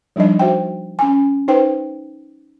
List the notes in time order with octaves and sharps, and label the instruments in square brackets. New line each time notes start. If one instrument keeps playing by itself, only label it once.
[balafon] F3 G3 D4 D#4 D#5
F#4 C5 E5 G5
C#4 G#5
D#4 B4 C5 G5